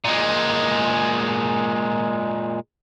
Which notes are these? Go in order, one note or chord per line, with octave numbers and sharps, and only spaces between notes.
A#2 G#3